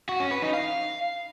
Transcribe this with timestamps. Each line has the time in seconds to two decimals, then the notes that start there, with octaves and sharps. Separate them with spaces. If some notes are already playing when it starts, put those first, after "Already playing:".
0.09 F#4
0.20 C#4
0.31 B4
0.42 D#4
0.53 F5